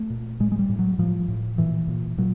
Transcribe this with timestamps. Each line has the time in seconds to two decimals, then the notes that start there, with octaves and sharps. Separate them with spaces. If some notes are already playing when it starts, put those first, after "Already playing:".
Already playing: A3
0.10 A#2
0.40 A2 G#3
0.52 G#3
0.59 G3
0.69 A2
0.79 F#3
0.98 A2 F3
1.28 A2
1.58 A#2 E3
1.88 A#2
2.18 A#2 F#3